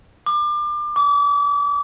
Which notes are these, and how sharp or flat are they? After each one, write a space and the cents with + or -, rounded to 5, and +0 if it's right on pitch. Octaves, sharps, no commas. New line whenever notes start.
D6 +30
D6 -35